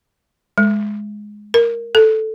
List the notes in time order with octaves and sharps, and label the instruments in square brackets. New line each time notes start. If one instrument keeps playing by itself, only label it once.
[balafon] G#3
A#4
A4